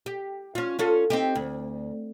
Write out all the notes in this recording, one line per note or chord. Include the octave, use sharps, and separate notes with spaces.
G4
C#4 F4
C#4 F4 A4
C4 D#4 G4
D2